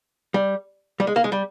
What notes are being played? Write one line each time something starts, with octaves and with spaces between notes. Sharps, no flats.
G3
G3
G#3
A#3
G#3
G3